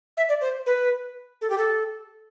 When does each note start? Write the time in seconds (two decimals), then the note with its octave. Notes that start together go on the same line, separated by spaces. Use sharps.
0.17 E5
0.29 D5
0.41 C5
0.66 B4
1.41 A4
1.50 G4
1.58 A4